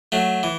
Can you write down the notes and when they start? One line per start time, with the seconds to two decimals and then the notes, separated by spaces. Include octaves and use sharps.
0.12 F#3 A3
0.43 E3